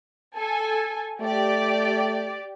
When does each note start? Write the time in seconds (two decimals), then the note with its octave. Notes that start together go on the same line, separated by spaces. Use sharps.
0.36 A4 G#5
1.21 A3 G4 D5